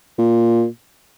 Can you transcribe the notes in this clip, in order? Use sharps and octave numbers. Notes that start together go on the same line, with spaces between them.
A#2